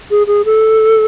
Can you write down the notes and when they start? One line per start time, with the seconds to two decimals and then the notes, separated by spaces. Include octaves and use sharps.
0.11 G#4
0.27 G#4
0.45 A4